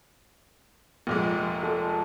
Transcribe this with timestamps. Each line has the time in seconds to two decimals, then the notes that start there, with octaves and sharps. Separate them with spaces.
1.07 F1 A#2 G#3
1.63 A4